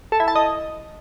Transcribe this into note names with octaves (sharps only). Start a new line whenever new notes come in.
A4
E4
A5
D#5